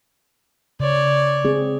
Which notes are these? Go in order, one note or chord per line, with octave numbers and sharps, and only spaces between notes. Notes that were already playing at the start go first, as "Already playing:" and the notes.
C#3 C#5 D5
C4 G#4